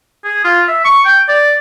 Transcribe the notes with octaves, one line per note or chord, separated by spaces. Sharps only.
G#4
F4
E5
C#6
G5
D5